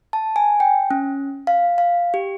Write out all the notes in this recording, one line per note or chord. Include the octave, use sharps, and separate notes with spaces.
A5
G#5
G5
C#4
F5
F5
G4